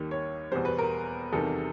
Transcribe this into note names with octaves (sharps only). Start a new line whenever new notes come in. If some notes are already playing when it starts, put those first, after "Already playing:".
Already playing: D#2 D#3 G3
C#5
E2 B2 G3 C5
B4
A#4
E2 C3 D#3 G3 A4